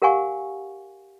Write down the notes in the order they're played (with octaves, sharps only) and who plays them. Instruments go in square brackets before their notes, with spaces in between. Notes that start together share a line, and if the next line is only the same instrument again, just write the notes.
[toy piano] G4 A#4 F5 F#5 G#5 C#6